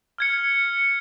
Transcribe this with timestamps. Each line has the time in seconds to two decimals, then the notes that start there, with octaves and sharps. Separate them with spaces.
0.18 F6 G#6 C#7